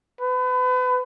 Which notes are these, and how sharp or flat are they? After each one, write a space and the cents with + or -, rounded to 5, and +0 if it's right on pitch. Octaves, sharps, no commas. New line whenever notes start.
B4 +35